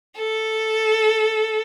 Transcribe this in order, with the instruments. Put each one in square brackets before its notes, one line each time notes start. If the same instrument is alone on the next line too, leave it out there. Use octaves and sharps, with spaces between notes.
[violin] A4